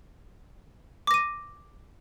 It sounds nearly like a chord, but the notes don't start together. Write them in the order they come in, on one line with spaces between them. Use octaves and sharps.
D6 A#6 D#7